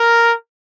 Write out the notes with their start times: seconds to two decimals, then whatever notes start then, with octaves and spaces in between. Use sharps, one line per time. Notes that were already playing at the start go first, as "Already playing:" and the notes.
Already playing: A#4